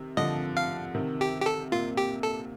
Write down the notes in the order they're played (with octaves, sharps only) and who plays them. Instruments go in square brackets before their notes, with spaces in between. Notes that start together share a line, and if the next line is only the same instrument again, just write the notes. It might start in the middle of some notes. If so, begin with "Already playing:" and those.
Already playing: [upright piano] C3 D#3
[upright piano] D3 F3 [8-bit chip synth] D#5
[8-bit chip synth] F5
[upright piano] C3 D#3
[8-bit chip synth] G4
G4
A4
[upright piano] A#2 [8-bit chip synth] F4
[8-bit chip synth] G4
A4